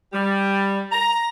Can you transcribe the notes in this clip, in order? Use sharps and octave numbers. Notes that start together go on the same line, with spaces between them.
G3
A#5